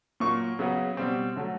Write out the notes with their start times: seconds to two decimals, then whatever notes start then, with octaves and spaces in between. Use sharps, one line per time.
0.20 A#2 F#3 A#3 C#6
0.59 C#3 F#3 B3
0.97 B2 G3 C4
1.36 D3 F#3 A3